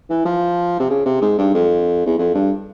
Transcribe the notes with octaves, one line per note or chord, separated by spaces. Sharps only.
E3
F3
C3
C#3
C3
G#2
G2
F2
E2
F2
G2